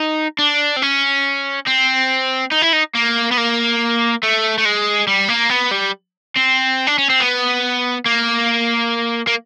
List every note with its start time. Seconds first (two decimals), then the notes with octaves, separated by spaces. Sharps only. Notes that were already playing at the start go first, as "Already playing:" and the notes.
Already playing: D#4
0.39 D4
0.77 C4
0.82 C#4
1.67 C4
2.52 D#4
2.62 E4
2.73 D#4
2.95 A#3
3.32 B3
3.38 A#3
4.23 A3
4.58 A3
4.65 G#3
5.07 G3
5.28 A#3
5.50 B3
5.71 G3
6.36 C4
6.87 D4
6.98 C#4
7.10 C4
7.20 B3
8.06 A#3
9.27 A#3